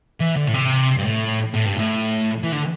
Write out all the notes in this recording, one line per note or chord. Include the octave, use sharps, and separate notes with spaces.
E3
D3
A2
C3
G2
A2
A2
G2
A2
E3
D3